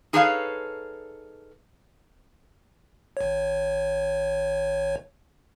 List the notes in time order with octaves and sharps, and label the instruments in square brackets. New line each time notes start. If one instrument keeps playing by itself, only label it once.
[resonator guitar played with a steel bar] D#4 G#4 A4 B4 C#5 F5
[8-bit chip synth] G#1 C#5